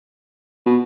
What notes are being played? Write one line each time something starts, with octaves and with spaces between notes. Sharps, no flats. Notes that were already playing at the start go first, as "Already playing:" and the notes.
B2